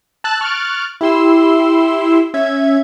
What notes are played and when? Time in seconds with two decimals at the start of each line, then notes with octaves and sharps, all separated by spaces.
0.24 A5 E6 F#6 A6
0.41 C#6 F6 F#6 A6 D7
1.01 E4 G4 C6 E6
2.34 C#4 E5 G#6